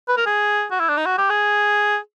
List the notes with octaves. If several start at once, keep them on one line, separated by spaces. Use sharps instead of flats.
B4
A#4
G#4
F#4
E4
D4
D#4
F#4
G4
G#4